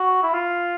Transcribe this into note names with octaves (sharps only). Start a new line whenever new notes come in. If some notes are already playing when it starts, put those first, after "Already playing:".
Already playing: F#4
E4
F4